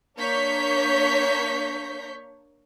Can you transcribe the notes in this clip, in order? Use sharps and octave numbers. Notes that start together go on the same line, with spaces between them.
A#3 D4 C#5 C#6 G6 B6